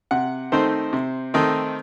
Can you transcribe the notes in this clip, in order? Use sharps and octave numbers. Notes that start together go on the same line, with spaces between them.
C3 F#5
D#3 A3 C4 D#4 C5
C3
D#3 A3 C4 D#4